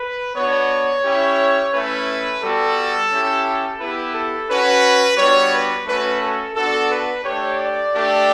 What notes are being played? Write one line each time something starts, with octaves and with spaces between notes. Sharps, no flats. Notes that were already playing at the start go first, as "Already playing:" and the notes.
Already playing: B4
B3 D4 F#4 C#5
C#4 E4 G4
A3 C#4 E4 B4
G3 B3 F#4 A4
C#4 E4 G4
B3 E4 G4 B4
A4
C#4 F#4 B4
G3 B3 D4 F#4 C#5
B4
A3 C#4 F#4 B4
A4
B3 D4 F#4 A4
B4
A3 D4 G4 C#5
D5
A3 D4 G4